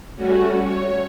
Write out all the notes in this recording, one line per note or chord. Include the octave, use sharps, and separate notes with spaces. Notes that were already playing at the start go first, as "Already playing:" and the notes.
G3 A3 C#4 F#4
C#5